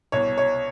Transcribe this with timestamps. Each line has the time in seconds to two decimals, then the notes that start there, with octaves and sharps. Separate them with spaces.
0.12 C2 B2 C#5
0.38 C#5